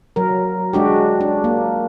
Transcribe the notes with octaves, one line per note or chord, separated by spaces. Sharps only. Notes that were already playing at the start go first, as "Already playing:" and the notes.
F#3 A#4
G#3 D4 F#4 G4
D4
A#3